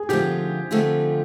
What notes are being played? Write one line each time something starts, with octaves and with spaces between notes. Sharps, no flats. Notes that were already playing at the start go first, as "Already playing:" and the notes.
Already playing: G#4
D3 F3 A3 C4 F4 G4
D3 F3 A3 C4 F4